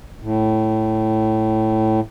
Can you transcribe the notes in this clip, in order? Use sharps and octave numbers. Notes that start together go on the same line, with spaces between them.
A2